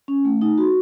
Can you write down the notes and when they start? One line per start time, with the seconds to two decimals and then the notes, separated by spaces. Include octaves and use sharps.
0.08 C#4
0.25 A3
0.41 D#4
0.58 F#4